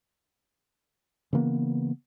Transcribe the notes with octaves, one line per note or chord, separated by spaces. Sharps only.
C#3 E3 A#3 B3